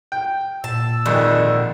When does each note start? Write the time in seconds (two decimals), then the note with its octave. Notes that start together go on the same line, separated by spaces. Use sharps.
0.12 G5
0.64 A#2 A5 E6
1.06 G#1 F2 D3 D#3